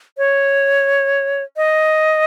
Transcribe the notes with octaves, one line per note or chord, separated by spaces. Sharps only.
C#5
D#5